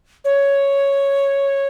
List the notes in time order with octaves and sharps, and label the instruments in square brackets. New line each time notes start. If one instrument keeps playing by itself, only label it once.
[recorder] C#5